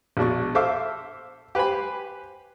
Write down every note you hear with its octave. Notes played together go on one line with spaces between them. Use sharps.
A#1 B2 D4 C#6
A4 C5 E5 F5 D6
G4 B4 C5 G#5 B5